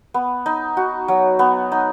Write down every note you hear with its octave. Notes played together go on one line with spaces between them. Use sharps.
B3
D#4
F#4
F#3
B3
D#4